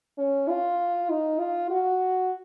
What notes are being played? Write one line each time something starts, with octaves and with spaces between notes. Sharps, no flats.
C#4
F4
D#4
F4
F#4